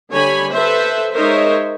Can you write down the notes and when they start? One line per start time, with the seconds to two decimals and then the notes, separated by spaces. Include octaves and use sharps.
0.12 D3 G3 C#5 G#5 B5
0.53 A4 B4 C5 E5
1.13 G#3 D#4 A#4 C5 C#5 E5